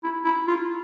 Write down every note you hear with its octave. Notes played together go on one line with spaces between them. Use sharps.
E4
E4
F4